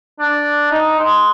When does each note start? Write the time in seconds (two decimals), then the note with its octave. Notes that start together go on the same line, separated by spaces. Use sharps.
0.20 D4
0.71 D#4
0.99 G#3